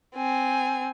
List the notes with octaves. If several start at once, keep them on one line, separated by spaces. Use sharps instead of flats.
C4 G#5